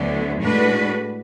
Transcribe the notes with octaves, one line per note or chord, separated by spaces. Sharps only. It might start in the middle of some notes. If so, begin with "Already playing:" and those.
Already playing: D2 D3 F#3 B3 E4
A2 G#3 D4 F#4 B4